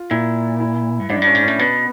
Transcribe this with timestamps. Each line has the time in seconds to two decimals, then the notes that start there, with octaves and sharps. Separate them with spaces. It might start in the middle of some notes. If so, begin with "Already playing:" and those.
Already playing: F4
0.10 A#2 E4
0.60 E4
1.00 G2
1.10 G#2 D4
1.16 F#2
1.22 G2 C#4
1.35 G#2
1.43 C#4
1.48 A2
1.59 B2 B3